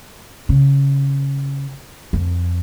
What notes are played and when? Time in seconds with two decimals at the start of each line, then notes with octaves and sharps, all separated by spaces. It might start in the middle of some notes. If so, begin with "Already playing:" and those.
0.49 C#3
2.13 F2